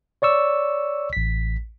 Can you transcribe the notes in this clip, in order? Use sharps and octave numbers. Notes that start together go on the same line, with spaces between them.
C#5 D5 C#6 E6
A1 B6